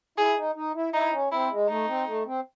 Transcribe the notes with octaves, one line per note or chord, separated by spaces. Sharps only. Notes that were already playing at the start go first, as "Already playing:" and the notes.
E4 G#4
D#4
D#4
E4
D#4 E4
C#4
C4 E4
G#3
A3 D#4
C4
A3
C4